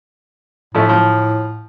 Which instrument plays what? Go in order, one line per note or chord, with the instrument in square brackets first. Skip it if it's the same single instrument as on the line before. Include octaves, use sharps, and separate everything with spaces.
[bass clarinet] A2 [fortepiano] F3 A3 C#4
[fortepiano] F3